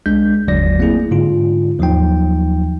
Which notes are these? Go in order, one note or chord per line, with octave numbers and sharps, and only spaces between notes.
C2 G#3 D4 G6
G1 D#2 D3 F#3 D5 A#6
A3 A#3 C4 E4 G#4
G#2 D3 F4
D#2 F3 F#3 D#4 G5